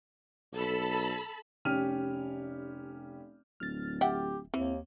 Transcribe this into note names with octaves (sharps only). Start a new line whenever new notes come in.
B1 A4 A5 B5
F1 C#4 G4 F6 D#7
D1 F6 A6
G4 E5 F#5 G5
D#2 E3 C4